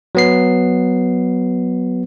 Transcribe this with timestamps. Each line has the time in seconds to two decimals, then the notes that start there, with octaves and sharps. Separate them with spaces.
0.15 F#3 B3 C7